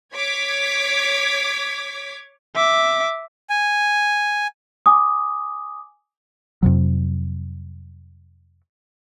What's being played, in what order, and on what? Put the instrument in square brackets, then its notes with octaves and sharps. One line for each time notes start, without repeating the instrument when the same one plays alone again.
[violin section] C#5 D6 G#6 B6
[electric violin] E5 D6
[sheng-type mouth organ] G#5
[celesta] G#5 D6 D#6
[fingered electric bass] F2 C3 F#3